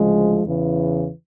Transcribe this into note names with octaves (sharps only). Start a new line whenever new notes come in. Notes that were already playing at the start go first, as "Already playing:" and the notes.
Already playing: D2 C#3 F3 G#3
E2 C#3 E3